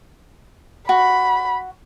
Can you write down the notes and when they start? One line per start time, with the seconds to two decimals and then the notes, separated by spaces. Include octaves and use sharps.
0.89 F#4 B5